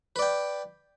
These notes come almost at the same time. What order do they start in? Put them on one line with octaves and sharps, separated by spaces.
B4 D5 G5